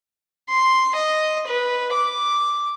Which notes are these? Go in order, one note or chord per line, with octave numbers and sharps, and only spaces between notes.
C6
D#5
B4
D6